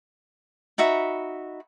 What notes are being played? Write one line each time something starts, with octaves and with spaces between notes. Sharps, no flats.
D#4 F#4 E5 B5